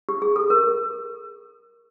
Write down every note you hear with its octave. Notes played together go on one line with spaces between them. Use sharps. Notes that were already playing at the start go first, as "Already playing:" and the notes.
G4
G#4
A4
A#4